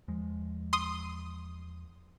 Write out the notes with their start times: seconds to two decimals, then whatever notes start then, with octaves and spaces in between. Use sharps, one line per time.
0.08 E2 F3 G#3
0.73 C6 D#6